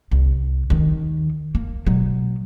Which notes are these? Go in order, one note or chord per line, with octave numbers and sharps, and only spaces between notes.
C2
D#2 D#3
A#3
B2 F#3